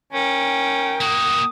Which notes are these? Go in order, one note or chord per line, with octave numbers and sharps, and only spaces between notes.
C#4 A#4 G5
A#3 F#4 D#6